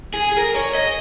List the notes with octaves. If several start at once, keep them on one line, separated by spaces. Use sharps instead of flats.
G#4
G#4
A#4
C#5
D#5